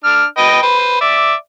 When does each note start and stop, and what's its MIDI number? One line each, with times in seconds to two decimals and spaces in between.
0.04 0.24 62
0.04 0.24 89
0.38 0.60 71
0.38 0.60 75
0.38 0.60 79
0.62 0.96 71
0.62 0.96 72
1.01 1.33 74
1.01 1.33 76